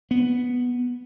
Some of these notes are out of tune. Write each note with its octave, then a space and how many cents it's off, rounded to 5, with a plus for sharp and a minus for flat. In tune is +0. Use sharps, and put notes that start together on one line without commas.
B3 +0